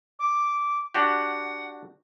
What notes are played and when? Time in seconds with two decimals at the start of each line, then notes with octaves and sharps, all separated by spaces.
0.19 D6
0.94 D4 F#4 G4 F#5